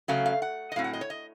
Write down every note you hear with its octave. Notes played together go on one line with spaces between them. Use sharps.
C#3 F#3 A3 C#4 F5
F5
F#5
D#5
A2 F#3 C4 F5
F#5
D#5
C#5
D#5